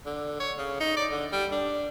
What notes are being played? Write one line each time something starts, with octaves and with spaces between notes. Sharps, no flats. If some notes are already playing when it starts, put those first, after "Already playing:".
D3
C#5
C#3
D#4
D5
D3
G3
D4